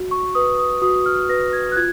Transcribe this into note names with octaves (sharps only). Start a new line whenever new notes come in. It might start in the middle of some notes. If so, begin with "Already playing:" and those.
Already playing: F#4
C#6
B4 D#6
D#6
F#4 D#6
F6
B4 A#6
G#6
F#6
F4 G#6